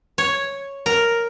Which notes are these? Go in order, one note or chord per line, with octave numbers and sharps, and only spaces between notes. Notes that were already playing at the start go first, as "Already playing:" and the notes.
C#5
A#4